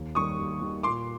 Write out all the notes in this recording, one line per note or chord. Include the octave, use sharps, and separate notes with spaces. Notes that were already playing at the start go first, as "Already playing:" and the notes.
Already playing: D#2
D#3 G3 C#6 D#6
D#2
D#3 G3
A#2 C6 D6